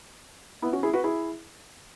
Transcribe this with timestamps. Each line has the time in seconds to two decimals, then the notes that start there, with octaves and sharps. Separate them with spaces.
0.62 B3 E4
0.72 C#4 F#4
0.83 E4 G#4
0.93 F#4 B4
1.04 E4 G#4